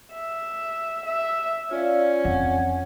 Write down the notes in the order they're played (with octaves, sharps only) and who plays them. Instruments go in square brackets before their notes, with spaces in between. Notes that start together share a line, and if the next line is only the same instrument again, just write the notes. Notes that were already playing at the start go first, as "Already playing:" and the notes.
[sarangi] E5
E5
[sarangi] C#4 [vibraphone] F4 D5 F5
[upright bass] F2 [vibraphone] F#5